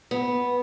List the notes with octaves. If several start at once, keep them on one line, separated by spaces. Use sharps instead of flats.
B3